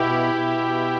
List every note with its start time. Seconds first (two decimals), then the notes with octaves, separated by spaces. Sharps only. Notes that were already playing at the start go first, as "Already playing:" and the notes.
Already playing: B2 E4 G4
0.34 B2